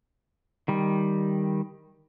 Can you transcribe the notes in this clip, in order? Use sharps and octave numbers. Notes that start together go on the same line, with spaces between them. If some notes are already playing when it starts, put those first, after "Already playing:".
D#3 G3